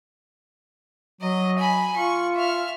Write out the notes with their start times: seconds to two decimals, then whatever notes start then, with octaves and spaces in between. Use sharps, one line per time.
1.21 F#3 D#5
1.58 G#5 B5
1.95 F4 C#6
2.35 E5 F6